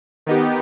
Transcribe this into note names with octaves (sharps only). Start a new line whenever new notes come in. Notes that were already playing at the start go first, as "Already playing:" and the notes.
D#3 B3 D#4 G4